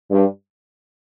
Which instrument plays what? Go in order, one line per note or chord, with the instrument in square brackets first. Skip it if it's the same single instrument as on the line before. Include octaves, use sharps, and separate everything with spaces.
[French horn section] G2